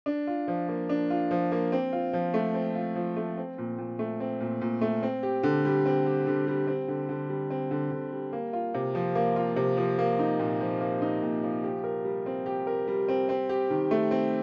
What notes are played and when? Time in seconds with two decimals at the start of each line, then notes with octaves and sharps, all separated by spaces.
0.06 D4
0.27 F4
0.48 F3
0.69 A#3
0.89 D4
1.10 F4
1.31 F3
1.52 A#3
1.72 C4
1.93 F4
2.13 F3
2.34 A3
2.54 C4
2.75 F4
2.95 F3
3.16 A3
3.38 C4
3.58 A#2
3.78 A#2
3.99 A3
4.20 C4
4.40 A#2
4.61 A#2
4.81 A3
5.03 C4
5.23 G4
5.43 D3
5.65 G3
5.86 C4
6.06 G4
6.27 D3
6.47 G3
6.67 C4
6.88 D3
7.09 D3
7.30 G3
7.50 C4
7.71 D3
7.91 D3
8.12 G3
8.33 A#3
8.53 F4
8.74 C3
8.95 F3
9.15 A#3
9.36 F4
9.56 C3
9.77 F3
9.99 A#3
10.19 D#4
10.39 A#2
10.61 F3
10.81 A#3
11.02 D#4
11.22 A#2
11.43 F3
11.64 G4
11.84 A#4
12.05 G3
12.26 C4
12.46 G4
12.67 A#4
12.88 G3
13.08 C4
13.29 C4
13.49 G4
13.70 D#3
13.91 A3
14.11 C4